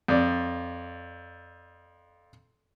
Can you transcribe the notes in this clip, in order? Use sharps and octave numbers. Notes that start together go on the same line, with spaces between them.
F2 D5